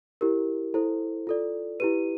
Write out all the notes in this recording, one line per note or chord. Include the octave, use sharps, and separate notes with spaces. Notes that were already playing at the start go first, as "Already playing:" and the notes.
E4 G4 A#4
E4 A4 C5
F4 A4 D5
E4 G4 B4 D#7